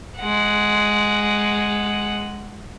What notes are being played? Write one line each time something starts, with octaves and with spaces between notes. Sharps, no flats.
G#3 F#5